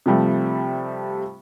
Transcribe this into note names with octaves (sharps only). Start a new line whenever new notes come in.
C3 F3 G3 A3